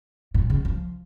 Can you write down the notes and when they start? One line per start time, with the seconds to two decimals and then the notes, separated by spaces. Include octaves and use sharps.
0.34 A#2
0.50 C#3
0.65 F3